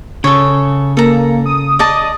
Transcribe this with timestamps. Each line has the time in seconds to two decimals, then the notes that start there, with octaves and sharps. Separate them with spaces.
0.24 C#3 A4 C#5
0.97 A#3 A4 A#5
1.46 D#6
1.79 D5 D#5 A5